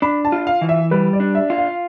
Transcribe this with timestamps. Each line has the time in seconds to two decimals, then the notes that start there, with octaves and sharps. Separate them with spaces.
0.02 D4 B5
0.25 A5
0.32 F4
0.47 F5
0.61 E3
0.69 E5
0.91 G3 B4
1.13 D5
1.20 D4
1.35 E5
1.50 F4
1.58 F5